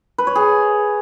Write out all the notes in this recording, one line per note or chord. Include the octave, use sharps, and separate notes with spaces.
B4
C#5
G#4